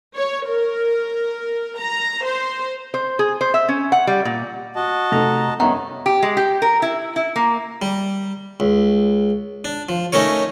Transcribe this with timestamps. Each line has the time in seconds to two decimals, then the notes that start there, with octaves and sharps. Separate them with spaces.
0.15 C#5
0.46 A#4
1.79 A#5
2.25 C5
2.94 C5
3.19 G#4
3.41 C5
3.54 E5
3.68 C#4
3.92 F#5
4.07 G3
4.25 A#2
4.76 F#4 D#5 A5
5.12 C3 A3 D#4 A4 A#5
5.60 D#3 G3 B3 C#4 E5 A#5
6.06 G4
6.22 G#3
6.37 G4
6.62 A#4
6.82 E4
7.16 E4
7.36 A#3
7.82 G3
8.60 C#2
9.65 D4
9.89 F3
10.13 A3 C#4 D#4 A#4 C#5